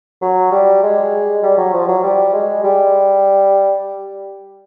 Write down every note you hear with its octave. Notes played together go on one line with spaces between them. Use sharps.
F#3
G3
G#3
G3
F#3
F3
F#3
G3
G#3
G3